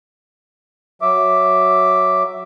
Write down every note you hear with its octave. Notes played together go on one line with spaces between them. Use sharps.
F#3 E5 D6